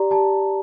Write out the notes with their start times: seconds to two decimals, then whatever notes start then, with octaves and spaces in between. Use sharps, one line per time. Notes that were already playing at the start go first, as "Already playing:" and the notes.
Already playing: G4 D5 A#5
0.11 G4 A5